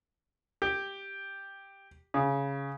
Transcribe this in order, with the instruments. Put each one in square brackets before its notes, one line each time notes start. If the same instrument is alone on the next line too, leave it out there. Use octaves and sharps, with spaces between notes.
[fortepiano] G4
C#3